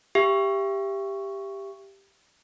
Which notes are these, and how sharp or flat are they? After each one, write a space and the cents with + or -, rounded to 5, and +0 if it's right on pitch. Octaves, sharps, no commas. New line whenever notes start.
G4 +5 E5 +35